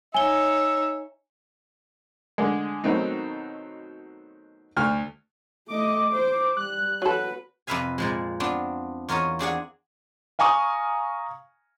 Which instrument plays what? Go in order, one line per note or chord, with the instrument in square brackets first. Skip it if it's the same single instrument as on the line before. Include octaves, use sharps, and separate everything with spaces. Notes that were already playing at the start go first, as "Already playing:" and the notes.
[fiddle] D#4 C#5 [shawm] E5 [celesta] G#5 G7
[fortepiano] D3 G#3
B2 D#3 F#3 A3 C4 D#4
D2 F6
[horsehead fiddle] A3 D#5 [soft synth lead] D6
[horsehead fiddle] C5
[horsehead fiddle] G3 [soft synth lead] F#6
[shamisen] F#3 A4 [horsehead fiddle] F#4 B4
[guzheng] F2 C3 B4 E5 F5 G#5
A#2 F3 G#3
B3 C4 D4 F4
E2 F4 A#4 C#5 D#5
C4 D4 G#4 F#5
[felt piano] F5 G#5 A#5 C#6 D#6